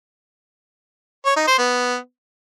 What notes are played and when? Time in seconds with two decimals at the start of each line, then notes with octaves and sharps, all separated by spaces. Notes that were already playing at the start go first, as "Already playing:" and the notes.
1.25 C#5
1.36 D#4
1.47 C5
1.58 B3